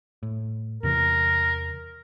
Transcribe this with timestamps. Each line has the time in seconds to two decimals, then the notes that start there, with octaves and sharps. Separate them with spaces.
0.23 A2
0.83 E2 C3 E3 A#4